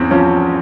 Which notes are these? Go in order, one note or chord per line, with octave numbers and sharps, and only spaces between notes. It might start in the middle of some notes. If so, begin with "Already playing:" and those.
Already playing: E2 C4 C#4
F3 C#4